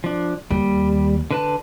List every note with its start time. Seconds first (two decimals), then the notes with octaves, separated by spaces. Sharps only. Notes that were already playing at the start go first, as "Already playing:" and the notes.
0.04 F3 D4
0.51 D#2 G3
1.31 D3 B4 A5